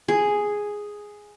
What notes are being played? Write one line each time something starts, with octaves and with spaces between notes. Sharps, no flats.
G#4